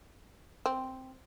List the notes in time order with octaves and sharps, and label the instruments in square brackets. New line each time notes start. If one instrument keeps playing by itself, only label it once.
[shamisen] C4